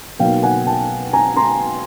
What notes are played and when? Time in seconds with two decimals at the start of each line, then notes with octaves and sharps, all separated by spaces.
0.20 B2 F#3 A#3 D#4 F5 G5
0.43 F#5 G#5
0.66 G5 A5
1.13 G#5 A#5
1.36 A#5 C6